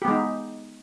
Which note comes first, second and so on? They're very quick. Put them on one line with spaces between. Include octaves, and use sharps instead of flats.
G4 B3 G#3 D#4